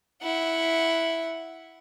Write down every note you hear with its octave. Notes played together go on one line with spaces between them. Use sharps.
E4 F#5